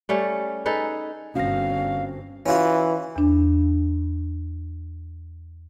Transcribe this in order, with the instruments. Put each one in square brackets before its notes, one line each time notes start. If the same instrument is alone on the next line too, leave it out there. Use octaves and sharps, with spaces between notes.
[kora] G3 A3 C#4
D#4 G#4 A4 B4
[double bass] G1 [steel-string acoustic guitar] C4 F#4 [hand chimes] C#4 A#6 [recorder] F5
[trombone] E3 [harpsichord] C#4 F4 F#4
[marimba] E2 D4